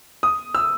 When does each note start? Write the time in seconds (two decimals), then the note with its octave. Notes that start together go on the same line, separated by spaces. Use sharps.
0.23 D#6
0.55 E6